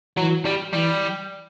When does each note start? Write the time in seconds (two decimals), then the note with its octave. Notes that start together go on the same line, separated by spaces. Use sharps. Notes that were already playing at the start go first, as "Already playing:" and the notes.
0.17 E3 F#3
0.45 G3
0.73 E3 G3